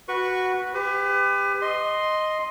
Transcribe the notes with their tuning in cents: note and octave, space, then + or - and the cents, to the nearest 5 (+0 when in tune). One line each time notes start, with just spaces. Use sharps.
F#4 +0 B4 -10 C#6 +0
G4 +30 B4 +35
D#5 +0 C6 +0